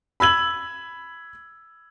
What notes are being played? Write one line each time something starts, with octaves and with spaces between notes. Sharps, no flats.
B5 E6 G#6 F#7